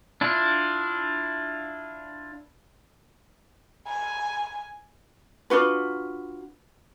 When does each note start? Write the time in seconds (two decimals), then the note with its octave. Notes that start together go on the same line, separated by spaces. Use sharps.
0.21 D4 E4 F4
3.88 G#5
5.50 D4 F4 F#4 B4